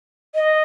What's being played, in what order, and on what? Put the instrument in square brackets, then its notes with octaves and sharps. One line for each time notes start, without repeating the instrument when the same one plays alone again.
[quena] D#5